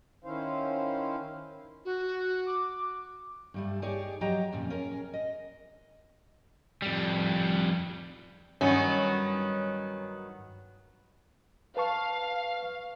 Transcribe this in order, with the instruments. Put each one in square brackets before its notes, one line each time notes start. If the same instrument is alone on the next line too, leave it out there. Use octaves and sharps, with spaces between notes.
[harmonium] D#3 C#4 E4 C5 F5
[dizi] F#4
[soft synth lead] D6
[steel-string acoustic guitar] G2 G3 A3
D#4 G4 G#4 C#5 D5
F3 F#3 G4 D#5 G5 A#5
F2 A#2 C#3
C#4 G#4 A#4
D#5
[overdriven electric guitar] F2 G3
[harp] G2 [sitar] D#3 F#3 B3 [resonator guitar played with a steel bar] C#4
[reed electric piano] B4 A5 C#6 [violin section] F5